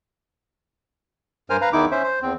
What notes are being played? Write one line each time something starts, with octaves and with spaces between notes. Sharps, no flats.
G2 A#4 C5 G#5 F6
B4 F5 A#5
E2 D#3 D#4 E4 D6
C#4 C5 E5
C5
E2 C4